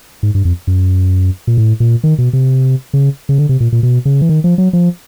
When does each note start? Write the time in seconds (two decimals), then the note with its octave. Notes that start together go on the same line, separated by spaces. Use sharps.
0.23 G#2
0.35 G2
0.45 F2
0.67 F#2
1.47 A#2
1.57 A2
1.80 A#2
2.04 D#3
2.18 B2
2.33 C3
2.93 C#3
3.29 C#3
3.38 D3
3.49 C3
3.60 A#2
3.72 A#2
3.83 B2
4.05 C#3
4.21 E3
4.29 D#3
4.44 F3
4.58 F#3
4.73 F3